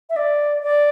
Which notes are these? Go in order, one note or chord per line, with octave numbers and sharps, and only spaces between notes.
E5
D5
D5